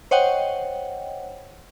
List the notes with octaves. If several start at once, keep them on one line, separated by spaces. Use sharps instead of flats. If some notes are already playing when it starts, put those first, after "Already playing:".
C5 C#5 D#5 F#5 G5